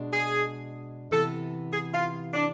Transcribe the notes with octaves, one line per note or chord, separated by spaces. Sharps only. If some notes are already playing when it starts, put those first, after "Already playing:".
Already playing: B2 G#3 D4
G#4
C3 E3 B3 A4
G#4
F4
D4